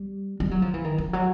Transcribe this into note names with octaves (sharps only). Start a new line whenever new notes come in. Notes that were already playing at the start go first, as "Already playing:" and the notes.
Already playing: G3
G3
F#3
F3
E3
D#3
F3
F#3